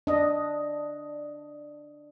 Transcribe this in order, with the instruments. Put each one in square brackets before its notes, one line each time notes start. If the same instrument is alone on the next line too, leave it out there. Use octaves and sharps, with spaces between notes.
[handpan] D4 D#5